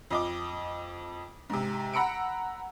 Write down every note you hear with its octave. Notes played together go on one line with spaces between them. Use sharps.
F2 D#5 D6
G#2 C3
F#5 A#5 B5 E6 C#7 D7